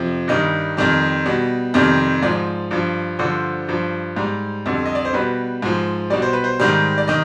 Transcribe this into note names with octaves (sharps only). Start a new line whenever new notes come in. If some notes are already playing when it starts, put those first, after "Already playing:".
Already playing: F2 C3 F3
G2 D#3 G3 D#5
F2 D#3 G3
B2 G3
F2 C3 D#3 G3
G#2 F3 D5
G2 F3
G2 D3 F3 C5
G2 F3
G#2 G3
F2 D3 G3
D#5
D5
C5
B2 G3 B4
G#2 F3
B2 G3 D5
C5
B4
C5
G#2 D#3 G3
D5
D#3 D#5